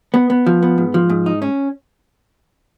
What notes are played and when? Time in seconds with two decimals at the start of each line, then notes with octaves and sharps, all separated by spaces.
0.14 B3
0.30 B3
0.46 F3
0.63 B3
0.78 G#2
0.94 F3
1.10 G#2
1.26 D#4
1.42 C#4